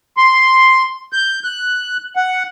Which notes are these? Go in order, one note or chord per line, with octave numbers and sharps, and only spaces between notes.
C6
G6
F#6
F#5